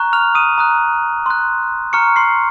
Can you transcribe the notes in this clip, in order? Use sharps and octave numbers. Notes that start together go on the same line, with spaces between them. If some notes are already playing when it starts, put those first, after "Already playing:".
Already playing: A#5 C#6 F#6
F6 F7
D#6 D#7
A#5 D#6 F#6
C6 F#6
A#5 C#6 F6 C#7
C6 C7